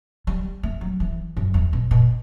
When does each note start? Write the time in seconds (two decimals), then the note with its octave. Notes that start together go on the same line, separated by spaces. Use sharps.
0.27 G3
0.63 A3
0.81 F#3
1.00 E3
1.37 F#2
1.54 E2
1.73 B2
1.91 B2